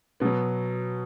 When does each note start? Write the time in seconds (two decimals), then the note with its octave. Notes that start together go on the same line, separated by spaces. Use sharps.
0.20 B2 F#3 B3